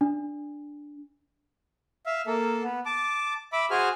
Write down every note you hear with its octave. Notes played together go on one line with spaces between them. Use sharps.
D4
E5 F5
A#3 A4
B3
A5 D6
E5 B5 D6
F#4 G#4 C5 G#5 F6